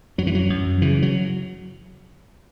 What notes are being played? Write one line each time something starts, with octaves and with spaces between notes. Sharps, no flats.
F#2 F#3
E3
F#3
F#2
C#3 E3
F#3